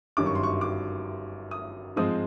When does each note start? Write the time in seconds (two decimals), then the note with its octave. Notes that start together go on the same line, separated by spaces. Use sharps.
0.17 G1 F#2 D#3 G3 D6
0.26 C#6
0.35 C6
0.43 C#6
0.61 D6
1.51 D#6
1.96 G#2 F3 G#3 C4 D#4 D#6